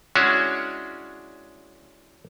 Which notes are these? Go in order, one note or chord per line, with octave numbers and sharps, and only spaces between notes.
G#3 C#4 D4 E4 F#4 C#5